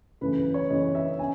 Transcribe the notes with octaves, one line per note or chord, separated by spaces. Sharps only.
F#2 C#3 E3 A3 C#4 B4
B4
C#5
F#2 C#3 E3 A3 C#4 D#5
E5
C#4 G#5